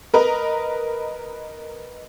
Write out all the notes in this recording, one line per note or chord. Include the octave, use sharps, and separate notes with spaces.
A#4 B4 D#5 A#5